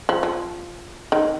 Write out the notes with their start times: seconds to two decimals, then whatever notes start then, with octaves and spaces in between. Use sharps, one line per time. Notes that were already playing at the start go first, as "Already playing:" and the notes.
0.09 F3
0.23 F3
1.12 D#3